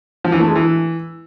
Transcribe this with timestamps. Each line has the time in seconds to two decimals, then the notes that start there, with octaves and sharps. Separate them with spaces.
0.24 F3
0.32 E3
0.40 A3
0.48 G#3
0.55 E3